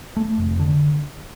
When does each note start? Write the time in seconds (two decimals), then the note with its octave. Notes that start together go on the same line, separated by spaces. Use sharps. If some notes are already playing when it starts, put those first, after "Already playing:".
0.17 A3
0.38 F1
0.60 D3